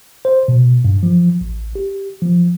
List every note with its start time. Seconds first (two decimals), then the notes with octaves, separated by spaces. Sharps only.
0.25 C5
0.48 B2
0.85 G2
1.03 F3
1.41 A1
1.75 G4
2.22 F3